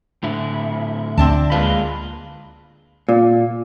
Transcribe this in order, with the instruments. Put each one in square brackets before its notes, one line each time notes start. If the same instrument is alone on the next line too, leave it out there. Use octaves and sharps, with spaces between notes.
[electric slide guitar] A2 D3 E4
[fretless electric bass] D2 [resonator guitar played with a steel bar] C4 D4 A5
[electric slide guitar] G#3 A#3 F4 [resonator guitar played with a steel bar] B4
[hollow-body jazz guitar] A#2